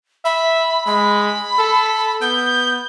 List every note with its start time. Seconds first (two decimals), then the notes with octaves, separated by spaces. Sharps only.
0.25 E5 B5
0.87 G#3 B5
1.59 A4
2.21 B3 G6